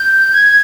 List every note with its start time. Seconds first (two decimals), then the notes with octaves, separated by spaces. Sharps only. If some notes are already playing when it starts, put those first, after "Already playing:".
Already playing: G6
0.33 G#6